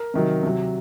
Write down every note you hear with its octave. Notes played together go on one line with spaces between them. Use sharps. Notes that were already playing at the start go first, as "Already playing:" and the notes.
Already playing: A#4
C3 D#3 F#3
C3 F#3